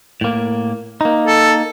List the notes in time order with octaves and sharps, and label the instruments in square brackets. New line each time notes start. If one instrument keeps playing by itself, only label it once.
[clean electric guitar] A2 A#3
A#3 D#4
[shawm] A4